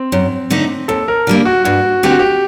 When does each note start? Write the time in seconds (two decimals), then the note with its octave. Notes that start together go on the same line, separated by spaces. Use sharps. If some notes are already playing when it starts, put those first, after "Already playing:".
Already playing: C4
0.12 F#2
0.50 D3 A3 D#4
0.88 D#2 A4
1.08 A#4
1.27 D3 G3 A#3
1.45 F#4
1.65 G2 F#4
2.03 D3 A3 C4 G4
2.11 F#4
2.19 G4